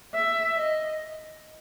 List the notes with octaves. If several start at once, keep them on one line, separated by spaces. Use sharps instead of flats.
E5
D#5